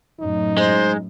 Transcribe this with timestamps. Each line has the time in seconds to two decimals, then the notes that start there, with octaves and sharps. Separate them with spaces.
0.20 F#2 A2 D#4
0.58 G#3 C5